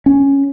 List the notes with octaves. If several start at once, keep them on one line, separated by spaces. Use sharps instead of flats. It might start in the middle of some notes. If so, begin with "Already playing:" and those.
C#4